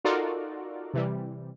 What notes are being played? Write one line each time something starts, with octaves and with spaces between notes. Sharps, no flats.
D#4 F4 F#4 A4 A#4 D5
C3 E3 G3